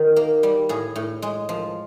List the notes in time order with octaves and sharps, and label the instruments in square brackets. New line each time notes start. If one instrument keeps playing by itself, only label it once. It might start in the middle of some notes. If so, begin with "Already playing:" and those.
Already playing: [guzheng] D#3 F#4
A#3
G3
A2 G#4
A2
G#3
F3